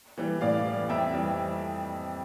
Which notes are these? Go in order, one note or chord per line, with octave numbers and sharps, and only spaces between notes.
E3 G3
A2 D5 F5
E3 G3
F2 E5 G5
E3 G3